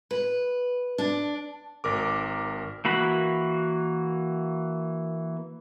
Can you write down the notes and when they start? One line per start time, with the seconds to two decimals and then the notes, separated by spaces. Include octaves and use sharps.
0.11 B4
0.98 D4
1.84 G#1 A#4 D6
2.85 E3 A#3 F#4 B5